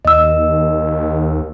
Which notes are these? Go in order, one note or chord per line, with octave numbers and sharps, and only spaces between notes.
D#2 D#5 E6